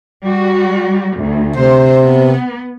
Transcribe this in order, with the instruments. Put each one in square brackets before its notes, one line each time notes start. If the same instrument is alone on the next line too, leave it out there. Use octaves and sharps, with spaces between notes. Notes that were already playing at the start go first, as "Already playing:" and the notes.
[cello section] G3 F#4
D2
[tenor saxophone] C3 [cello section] C5
[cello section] B3